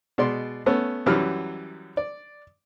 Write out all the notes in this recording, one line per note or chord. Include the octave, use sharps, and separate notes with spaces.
B2 G#3 D5 C6
A3 B3 C#4
F#2 E3 F#3 G3 F6
D5